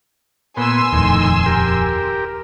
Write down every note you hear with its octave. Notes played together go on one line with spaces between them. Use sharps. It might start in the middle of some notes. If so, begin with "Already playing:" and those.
A#2 B3 G#5 C6 E6
D#1 F2 A2 D#3
G4 A#4